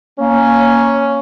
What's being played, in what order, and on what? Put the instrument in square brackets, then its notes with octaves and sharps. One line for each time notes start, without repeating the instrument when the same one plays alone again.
[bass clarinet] A#3 [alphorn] C#4